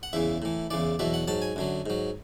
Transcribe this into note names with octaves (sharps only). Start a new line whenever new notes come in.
F#5
E2 C#3 E3 E5
A2 E3
E2 C#3 E3 D5
E2 B2 F#3 E5
F#5
G#2 F#3 A5
G#5
F#2 D3 F#3
G#2 F#3